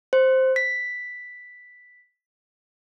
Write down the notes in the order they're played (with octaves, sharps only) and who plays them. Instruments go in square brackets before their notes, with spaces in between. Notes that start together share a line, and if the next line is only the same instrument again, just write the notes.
[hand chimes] C5
B6